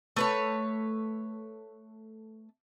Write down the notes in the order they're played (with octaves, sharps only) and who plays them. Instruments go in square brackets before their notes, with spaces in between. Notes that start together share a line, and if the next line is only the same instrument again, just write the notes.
[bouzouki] A3 B4 C#5